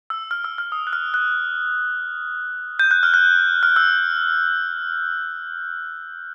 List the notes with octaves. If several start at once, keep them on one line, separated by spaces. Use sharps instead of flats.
E6
F6
E6
F6
D#6
F#6
F6
F#6
G6
F#6
F6
F#6
F6
E6